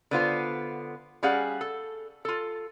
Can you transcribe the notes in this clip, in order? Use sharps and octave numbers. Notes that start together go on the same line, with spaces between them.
D3 B3 F4 C5
G3 C#4 G#4 F5 F#5
A4
F4 A4